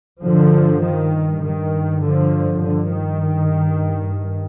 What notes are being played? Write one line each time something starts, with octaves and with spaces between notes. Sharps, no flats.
G2 D3 F3
D#3
D#3
D3 F3
G2 D3
D#3